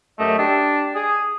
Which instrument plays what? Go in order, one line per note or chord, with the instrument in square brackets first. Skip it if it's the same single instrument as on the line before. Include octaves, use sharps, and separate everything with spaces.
[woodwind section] F#2 G4 D#5 [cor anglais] A3
[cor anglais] D4 [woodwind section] G4 A5
[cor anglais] G#4 [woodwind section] D#6